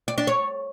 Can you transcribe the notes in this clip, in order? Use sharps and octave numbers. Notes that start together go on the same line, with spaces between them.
D5
D4
C#5